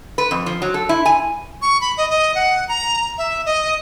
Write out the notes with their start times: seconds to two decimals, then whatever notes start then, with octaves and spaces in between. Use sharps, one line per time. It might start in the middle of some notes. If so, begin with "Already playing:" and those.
0.18 B4
0.31 F2
0.46 F3
0.62 F#3
0.74 A4
0.89 E4
1.06 G#5
1.62 C#6
1.81 B5
1.97 D#5
2.10 D#5
2.35 F#5
2.68 A#5
3.18 E5
3.46 D#5